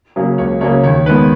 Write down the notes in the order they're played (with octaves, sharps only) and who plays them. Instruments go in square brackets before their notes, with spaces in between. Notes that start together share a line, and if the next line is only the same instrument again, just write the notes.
[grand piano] C#3 F#3 A#3 C#4
C#2 C#5
C#3 F#3 A#3 C#4 C#5
D#2 C#5
D#3 G#3 B3 B4